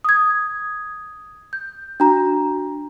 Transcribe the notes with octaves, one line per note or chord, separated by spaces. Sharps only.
D#6 G#6
G6
D4 F#4 A#5